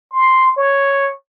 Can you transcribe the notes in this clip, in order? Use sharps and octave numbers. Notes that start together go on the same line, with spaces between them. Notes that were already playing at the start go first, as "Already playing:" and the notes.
C6
C#5